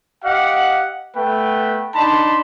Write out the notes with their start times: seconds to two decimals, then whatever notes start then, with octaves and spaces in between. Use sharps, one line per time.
0.24 G4 D#5 F5 F#5
1.16 A3 B3 B4 G5
1.95 D4 D#4 A5 B5 C6